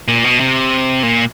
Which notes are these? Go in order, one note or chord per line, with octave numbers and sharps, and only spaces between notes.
A#2
B2
C3
A#2